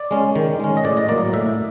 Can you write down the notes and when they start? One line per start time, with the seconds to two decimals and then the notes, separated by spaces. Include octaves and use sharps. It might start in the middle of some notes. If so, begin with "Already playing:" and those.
Already playing: D5
0.11 G#3 C#4
0.36 D#3
0.60 G#3 C#4
0.77 D#5
0.84 A2 D5
0.97 D#5
1.08 F#3 A#3 D5
1.33 A2 E5